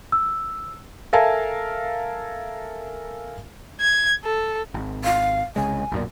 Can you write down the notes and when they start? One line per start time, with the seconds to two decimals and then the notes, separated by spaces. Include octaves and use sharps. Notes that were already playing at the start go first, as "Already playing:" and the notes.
0.12 E6
1.13 A4 A#4 E5 F5 G#5 A5
3.81 G#6
4.25 A4
4.74 G#1
5.04 F5
5.56 C2 C#3 G#3 G#5
5.92 B1 F#2 A#2